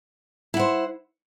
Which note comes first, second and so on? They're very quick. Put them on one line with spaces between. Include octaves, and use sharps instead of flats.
E4 F#5 C5